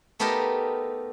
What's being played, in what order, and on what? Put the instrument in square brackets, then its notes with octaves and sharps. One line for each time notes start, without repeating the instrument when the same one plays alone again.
[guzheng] A3 B3 D#4 G4 A4 A#4